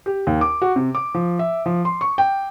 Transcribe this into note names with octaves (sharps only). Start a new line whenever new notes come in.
G4
D#2
D6
F#4
C3
D6
F3
E5
F3
C6
C#6
G5